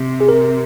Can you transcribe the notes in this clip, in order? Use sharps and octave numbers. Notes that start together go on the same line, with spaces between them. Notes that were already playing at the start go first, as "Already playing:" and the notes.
Already playing: C3
G#4
A#4